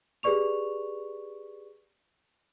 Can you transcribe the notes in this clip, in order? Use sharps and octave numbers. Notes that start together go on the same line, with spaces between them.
G4 G#4 B4 D5 C#6 F7